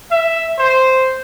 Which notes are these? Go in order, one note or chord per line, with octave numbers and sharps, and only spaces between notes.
E5
C5